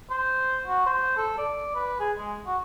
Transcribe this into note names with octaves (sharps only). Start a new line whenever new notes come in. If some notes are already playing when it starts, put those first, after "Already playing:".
C5
F#4
C5
A4
D5
B4
G#4
G#3
F#4